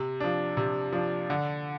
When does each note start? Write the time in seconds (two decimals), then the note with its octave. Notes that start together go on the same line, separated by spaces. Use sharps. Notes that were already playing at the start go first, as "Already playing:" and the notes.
Already playing: C3
0.20 F3 D4
0.57 C3
0.93 F3 D4
1.30 D3